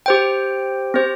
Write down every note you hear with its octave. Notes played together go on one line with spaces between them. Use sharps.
G4 C5 G5
C4 G4 C5